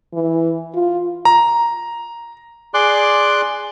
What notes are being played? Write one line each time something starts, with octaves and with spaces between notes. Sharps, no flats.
E3
F4
A#5
G#4 D5 C6 D6 F#6